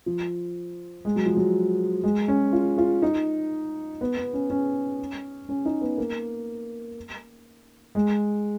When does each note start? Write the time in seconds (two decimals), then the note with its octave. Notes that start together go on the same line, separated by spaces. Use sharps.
0.06 F3
1.05 G#3
1.16 F#3
1.26 F3
1.37 F#3
2.04 G#3
2.28 C#4
2.52 F4
2.78 F4
3.02 D#4
4.01 B3
4.17 B3
4.34 C#4
4.50 C#4
5.49 C#4
5.65 D#4
5.81 B3
5.98 A#3
7.95 G#3